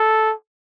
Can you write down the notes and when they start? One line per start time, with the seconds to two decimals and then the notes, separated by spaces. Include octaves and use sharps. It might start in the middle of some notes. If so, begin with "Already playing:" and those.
Already playing: A4